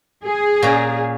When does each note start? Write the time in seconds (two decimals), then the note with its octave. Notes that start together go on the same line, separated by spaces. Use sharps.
0.24 G#4
0.63 A#2 C#4 A#5